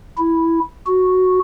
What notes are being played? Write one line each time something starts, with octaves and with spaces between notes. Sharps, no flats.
E4
F#4